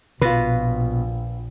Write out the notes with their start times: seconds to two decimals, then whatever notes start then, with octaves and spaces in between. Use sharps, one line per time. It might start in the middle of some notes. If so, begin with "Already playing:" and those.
0.22 A#1 B2 F4 B4